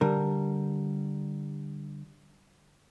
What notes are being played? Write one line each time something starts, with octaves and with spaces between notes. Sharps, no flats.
D3 G3 A#4